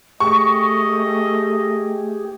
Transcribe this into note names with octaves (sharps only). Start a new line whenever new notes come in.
A3 G4 G#4 D#5 C#6